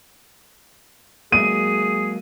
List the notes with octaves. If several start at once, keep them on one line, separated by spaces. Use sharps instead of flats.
F#3 G#3 A#3 G#4 D#7